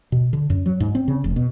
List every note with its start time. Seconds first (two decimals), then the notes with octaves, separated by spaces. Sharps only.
0.12 B2
0.33 D3
0.50 F#2
0.66 F#3
0.80 G#2
0.95 C4
1.08 C#3
1.24 F1
1.36 B2